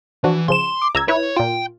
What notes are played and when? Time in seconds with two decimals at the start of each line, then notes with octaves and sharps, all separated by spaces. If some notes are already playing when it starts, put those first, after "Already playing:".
0.24 E3 F3 D4 F#4
0.48 C#3 F3 C6 E7
0.82 D6
0.95 C#2 A#5 E6 G#6
1.08 E4 B4 C#5
1.36 A#2 F4 G5